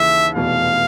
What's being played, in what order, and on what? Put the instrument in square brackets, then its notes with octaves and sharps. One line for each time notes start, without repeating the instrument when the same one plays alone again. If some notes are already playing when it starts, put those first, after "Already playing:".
Already playing: [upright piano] D#2 C#3 E3 [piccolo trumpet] E5
[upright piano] F1 E2 B2 [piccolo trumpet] F5